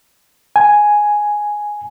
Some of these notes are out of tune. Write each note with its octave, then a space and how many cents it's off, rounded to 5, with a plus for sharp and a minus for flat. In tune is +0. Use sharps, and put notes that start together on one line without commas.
G#5 +0